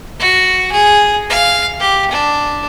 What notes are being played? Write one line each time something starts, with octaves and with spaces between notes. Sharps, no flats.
F#4
G#4
F5
G4
D4